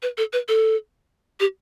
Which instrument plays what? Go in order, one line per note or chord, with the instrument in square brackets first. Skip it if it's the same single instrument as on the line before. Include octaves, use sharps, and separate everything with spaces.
[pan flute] B4
A4
B4
A4
G4